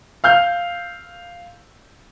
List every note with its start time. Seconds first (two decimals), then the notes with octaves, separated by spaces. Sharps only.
0.24 F5 F6 G6